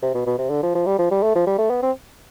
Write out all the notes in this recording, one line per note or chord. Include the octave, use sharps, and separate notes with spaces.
C3
B2
B2
C3
D3
F3
F3
G3
F3
G3
A3
F3
G3
A3
B3
C4